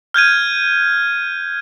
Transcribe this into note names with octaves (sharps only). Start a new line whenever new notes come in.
F6 G6 G#6 D#7